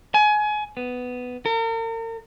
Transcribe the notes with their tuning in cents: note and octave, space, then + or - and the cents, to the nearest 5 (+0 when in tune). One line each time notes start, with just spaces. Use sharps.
G#5 +25
B3 +10
A#4 -40